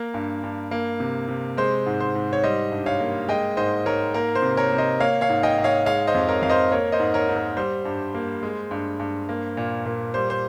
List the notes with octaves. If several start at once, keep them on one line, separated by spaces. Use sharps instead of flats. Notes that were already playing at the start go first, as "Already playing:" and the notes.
Already playing: A#3 A#4
G2
G2
A#3
C3
C3
G#3 C5
G#2
C5
G#2
C#5
G3 C5 D#5
G2
C#5 F5
A#3
G#3 D#5 G5
G#2 C5 D#5
G#2 A#4 C#5
A#3 A#4
C5
C3
A#4 C#5
C3
C5 D#5
A#3 C#5 F5
C#5 F5
G#2
D#5 G5
G#2
C#5 F5
G#3 C#5 F5
C5 D#5
F2
A#4 C#5
F2 F5
C5 D#5
A#3 A#4 C#5
C5 D#5
G#2
A#4 C#5
G#2
A#4
G3 C5
G2
A#3
G#3
G2
G2
A#3
A#2
A#2
G3 C5
C5